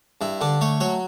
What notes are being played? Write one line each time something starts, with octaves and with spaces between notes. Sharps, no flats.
G2 E4
D3 D4
A3 C#5
F#3 C#5